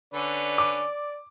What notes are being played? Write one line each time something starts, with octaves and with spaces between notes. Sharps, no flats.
D3 C#4 B4 D5
D6